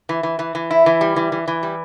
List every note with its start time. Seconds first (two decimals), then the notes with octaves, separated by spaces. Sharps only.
0.09 E3
0.23 E3
0.39 E3
0.55 E3
0.71 E4
0.86 E3
1.01 G3
1.16 E3
1.32 E3
1.48 E3
1.63 G3